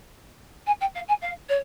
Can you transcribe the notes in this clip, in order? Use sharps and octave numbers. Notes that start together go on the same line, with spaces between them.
G#5
G5
F5
G#5
F5
C#5